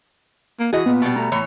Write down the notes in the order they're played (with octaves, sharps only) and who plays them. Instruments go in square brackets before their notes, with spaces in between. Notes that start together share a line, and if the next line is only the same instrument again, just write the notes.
[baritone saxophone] A#3
[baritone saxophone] E3 [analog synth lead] F#4 [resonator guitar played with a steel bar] G#4 D#5
[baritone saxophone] A#2 [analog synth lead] B3
[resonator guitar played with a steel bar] B2 G3
[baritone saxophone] A3 [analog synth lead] A#5
[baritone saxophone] A2 [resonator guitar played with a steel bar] E3 C#5